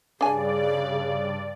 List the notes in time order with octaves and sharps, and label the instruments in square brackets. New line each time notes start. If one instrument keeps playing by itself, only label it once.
[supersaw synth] G2 D5 [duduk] C#3 [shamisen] D4 G#5 [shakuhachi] G#4